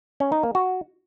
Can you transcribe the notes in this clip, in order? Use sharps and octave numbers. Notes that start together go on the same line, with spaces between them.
C#4
D#4
A#3
F#4